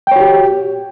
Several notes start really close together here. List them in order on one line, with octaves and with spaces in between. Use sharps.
G5 C#5 F#4 G4